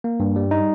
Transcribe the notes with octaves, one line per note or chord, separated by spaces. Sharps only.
A#3
G2
G3
D#4